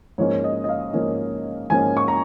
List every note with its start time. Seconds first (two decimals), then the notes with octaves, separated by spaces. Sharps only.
0.18 G#2 F3 A#3 C#4 C#5
0.44 D#5
0.64 D#5
0.69 F5
0.93 G#2 F3 A#3 C#4
1.70 G#2 F3 A#3 C#4 G#5
1.97 C#6
2.08 A#5